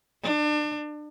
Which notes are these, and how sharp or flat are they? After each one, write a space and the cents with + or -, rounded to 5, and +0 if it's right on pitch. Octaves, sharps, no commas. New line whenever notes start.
D4 +30